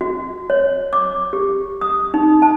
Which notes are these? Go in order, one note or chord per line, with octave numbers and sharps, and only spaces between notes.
F#4
C#5
D6
G4
D#6
D#4
A5